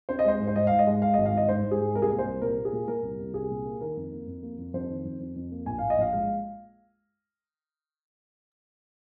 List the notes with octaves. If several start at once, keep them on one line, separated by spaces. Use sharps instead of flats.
C4 C5
D#5
G#3 C5
G#2
C5
G#2 D#5
G#2 F5
D#5
G#3
G#3 F5
G#1 D#5
F5
G#2 D#5
G#2 C5
G#2
G#4
G#3
C2 A#4
G#4
A#3 A#4
C5
C2
A#2 A#4
A#3
G#4
A#2
A#2 A#4
C2
C2
C2 G#4
A#2
A#3
D#3 A#4
F2
A#3
F2
A#3
F2
F2 C5
D#3
F2
F2
F2
A#3
A#1 G#5
A#1 F5
D#5
A#1 F5
G#3 F5